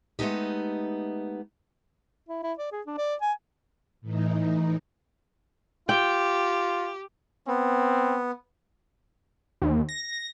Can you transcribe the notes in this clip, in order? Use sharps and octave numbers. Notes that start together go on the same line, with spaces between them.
G#3 A3 B3 C#4 D#4 G4
E4
E4
D5
G#4
D4
D5
G#5
A2 E3 D#4
F4 G4 G5
B3 C4
D#2
A#6